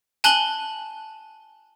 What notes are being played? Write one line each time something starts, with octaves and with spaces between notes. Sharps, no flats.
G#5 A5 F#6 F#7 G7